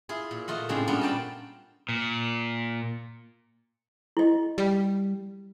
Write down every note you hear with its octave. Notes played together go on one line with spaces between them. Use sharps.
E4 F4 G#4
A#2
A3 F4 D#5 F#5
A2 C#3 G#3 C4 D4
A#2 G3 B3 C#4 D4 F4
C5 D5 G5 A5 A#5
A#2
E4 D#5
G3